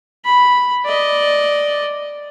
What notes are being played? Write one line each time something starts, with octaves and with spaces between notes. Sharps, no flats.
B5
D5 D#5